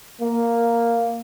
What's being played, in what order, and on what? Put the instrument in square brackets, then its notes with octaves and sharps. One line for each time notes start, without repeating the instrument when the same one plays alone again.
[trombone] A#3